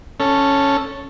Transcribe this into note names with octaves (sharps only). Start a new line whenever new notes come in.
C#4 A4